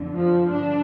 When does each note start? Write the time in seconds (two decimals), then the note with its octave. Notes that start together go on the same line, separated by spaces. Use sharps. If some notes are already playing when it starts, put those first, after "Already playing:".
Already playing: F2 D3
0.14 F3
0.53 G2 D3 D4